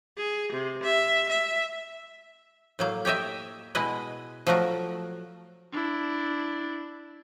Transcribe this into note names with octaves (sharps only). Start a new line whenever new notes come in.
G#4
C3
E5
E5
A2 F#3 A#3
G4 C#5 D#5 E5 G5
B2 G#3 E4 B4 D#5
F3 F#3 A3 F#4 A#4
D4 E4